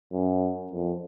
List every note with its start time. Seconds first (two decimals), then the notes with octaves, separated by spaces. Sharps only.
0.12 F#2
0.71 F2